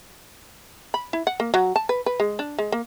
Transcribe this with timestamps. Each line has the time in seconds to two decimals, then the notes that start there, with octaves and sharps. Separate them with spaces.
0.94 B5
1.13 E4
1.27 F#5
1.40 A#3
1.54 F#3
1.76 A5
1.89 B4
2.06 B4
2.20 G#3
2.39 D4
2.59 G#3
2.72 A#3